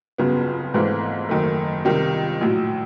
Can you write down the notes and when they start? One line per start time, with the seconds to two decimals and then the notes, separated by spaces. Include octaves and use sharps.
0.18 G1 F2 C#3 F#3 B3
0.74 G#1 G#2 E3 A3 C4
1.29 F#1 F#2 D#3 F#3 A3
1.85 C#2 C3 D#3 G3
2.41 A#1 A2 F#3